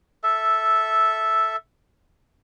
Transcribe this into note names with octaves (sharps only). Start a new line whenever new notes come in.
A4 E5